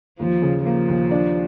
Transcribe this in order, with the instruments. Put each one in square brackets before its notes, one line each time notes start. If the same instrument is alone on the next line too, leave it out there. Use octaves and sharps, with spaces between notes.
[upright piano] D#2 [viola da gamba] F3
[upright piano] C#3
[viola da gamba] F3 [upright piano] A#3
[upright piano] D#2
D4